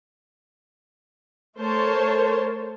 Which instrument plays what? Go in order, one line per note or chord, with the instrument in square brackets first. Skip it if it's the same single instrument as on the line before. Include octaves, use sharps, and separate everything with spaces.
[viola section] A3 A#4 C5 C#5 A5